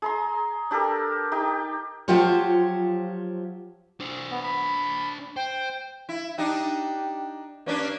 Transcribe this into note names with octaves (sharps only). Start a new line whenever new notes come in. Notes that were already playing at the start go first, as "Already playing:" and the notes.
G#4 A#5 C6
D4 G4 A4 A#4
D#4 G4 G5
F3 F#3 F4 G4 C5 C#5
D4 C5
B3
B5
C5 G5
E4
D4 D#4 G4
G2 A#3 C#4 D4